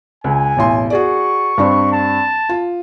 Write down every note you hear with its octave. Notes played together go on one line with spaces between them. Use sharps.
C#2 G#5
E1 A1 C6
F#4 G#4 D5 C#6
G2 C4 D4
A5
F4